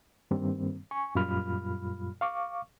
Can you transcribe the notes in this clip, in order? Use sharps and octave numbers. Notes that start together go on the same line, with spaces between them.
G2 D#3 G3 A#3 C4
G#5 C#6
F#2 A#2 G3 F4 B5 F6
F5 C#6 D6